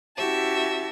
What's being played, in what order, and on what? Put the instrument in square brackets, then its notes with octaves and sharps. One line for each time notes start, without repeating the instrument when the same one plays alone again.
[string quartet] C#4 E4 F#4 G4 E5 A5